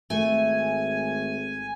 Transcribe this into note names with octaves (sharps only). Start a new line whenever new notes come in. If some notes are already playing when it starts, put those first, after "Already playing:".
G#1 A3 G#5